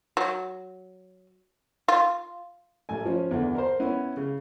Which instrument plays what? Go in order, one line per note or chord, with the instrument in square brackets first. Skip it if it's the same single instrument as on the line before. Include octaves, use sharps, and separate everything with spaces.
[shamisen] F#3
F4
[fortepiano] A1 A3 G#5
F3 C#4
E2 D3
A#4 C5
B3 C#4 E4
C#3